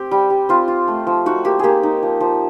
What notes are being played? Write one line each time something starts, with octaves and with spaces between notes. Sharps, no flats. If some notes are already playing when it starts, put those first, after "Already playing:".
Already playing: C4 G4
G3
G3
C4 F4
F4
A3
F3
D#4 F#4
A#3 G4
A#3 G4 G#4
D#4
F3
F3